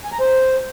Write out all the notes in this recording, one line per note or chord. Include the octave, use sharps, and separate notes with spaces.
G#5
A#5
C5